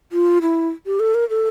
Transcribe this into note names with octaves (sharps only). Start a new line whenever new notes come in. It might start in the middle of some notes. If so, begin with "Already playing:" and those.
F4
E4
G4
A4
A#4
A4